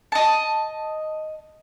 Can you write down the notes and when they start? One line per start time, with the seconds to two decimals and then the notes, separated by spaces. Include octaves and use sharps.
0.12 D#5 A5